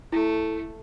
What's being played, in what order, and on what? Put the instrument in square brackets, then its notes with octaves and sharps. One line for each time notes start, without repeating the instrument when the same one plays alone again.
[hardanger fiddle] A3 [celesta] E4